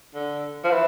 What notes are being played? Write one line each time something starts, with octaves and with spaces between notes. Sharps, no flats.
D3
F3
E3